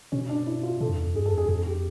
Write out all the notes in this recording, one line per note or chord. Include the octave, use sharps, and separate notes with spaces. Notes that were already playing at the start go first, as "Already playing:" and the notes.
B2 C#4
D4
E4
F4
B2 A4
F2
E2
F2
G2 G#4
A4
F2
G#4
F2 G#4
G4